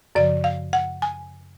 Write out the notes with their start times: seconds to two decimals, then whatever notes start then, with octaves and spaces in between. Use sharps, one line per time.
0.15 F#2 C#3 F3 D5
0.44 F5
0.73 F#5
1.02 G#5